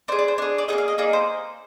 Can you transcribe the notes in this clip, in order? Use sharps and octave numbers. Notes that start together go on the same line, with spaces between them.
D4 G#4 C5
D5
C5
D4 G#4
D5
A#3 D#4 G#4 D#5
F5
D#5
A#3 D#4 G#4 D5
C5